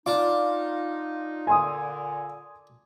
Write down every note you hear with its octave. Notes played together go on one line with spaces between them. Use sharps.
D4 D#4 F4 D6
A#2 D3 G#5 C6 D#6